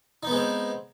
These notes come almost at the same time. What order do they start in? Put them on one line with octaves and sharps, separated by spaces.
D#4 B3 G#3 C4